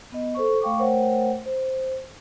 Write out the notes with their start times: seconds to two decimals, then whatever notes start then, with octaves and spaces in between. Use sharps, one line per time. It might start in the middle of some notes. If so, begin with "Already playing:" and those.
0.12 B3 D#5
0.35 A4 C5 C#6
0.62 A3 F5 G5 C#6 D6
0.78 A3 A#4 C5 C#5 F#5 G5
1.46 C5